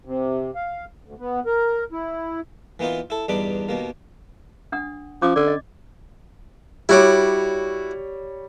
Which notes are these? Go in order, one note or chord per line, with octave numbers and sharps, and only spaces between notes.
C3
F5
D2
B3
A#4
E4
E3 A#3 B3 D#4 F4
E4 A4
E2 G2 D4 D#4 B5 D6
D#2 B2 A#3
D4 F#5 D#6
F3 C#4 D6
D3 D5 D6
D#5
G3 E4 F#4 C#5 D6